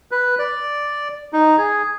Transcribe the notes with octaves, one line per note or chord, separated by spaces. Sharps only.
B4
D5
D#4
G#4